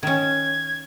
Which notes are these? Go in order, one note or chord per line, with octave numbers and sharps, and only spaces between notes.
D#3 C#4 G#6